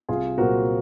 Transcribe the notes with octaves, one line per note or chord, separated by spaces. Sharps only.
C2 F4 G#4
A#2 F#3 C4 F#4 A#4